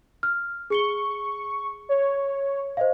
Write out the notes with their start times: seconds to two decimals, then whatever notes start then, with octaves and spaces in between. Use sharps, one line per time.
0.23 F6
0.70 G#4 C#6 C#7 G7
1.89 C#5
2.77 C5 D#5 F5